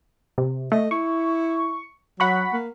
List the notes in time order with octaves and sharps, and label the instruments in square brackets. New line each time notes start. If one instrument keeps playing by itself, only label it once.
[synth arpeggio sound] C3
[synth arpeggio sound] A3 [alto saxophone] D#5
[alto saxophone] E4 [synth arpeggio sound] C#6
[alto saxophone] F#3 [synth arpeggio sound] F#5 B5 C#6
[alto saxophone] A#3